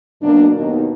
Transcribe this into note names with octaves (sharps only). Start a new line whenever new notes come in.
F#2 B2 A#3 D4
D#2 B2 B3 D#4